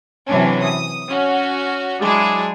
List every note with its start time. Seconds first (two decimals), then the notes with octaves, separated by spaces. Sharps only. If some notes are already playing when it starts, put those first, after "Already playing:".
0.27 C3 E3 F#3 C#4 D4
0.62 D#6
1.09 C#4 F#4
2.01 F#3 G#3 D4 E4 G#4